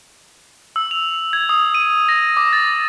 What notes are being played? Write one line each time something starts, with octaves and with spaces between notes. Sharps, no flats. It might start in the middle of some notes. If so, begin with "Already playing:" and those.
E6
F7
G#6
D#6
D#7
A#6
D6
A6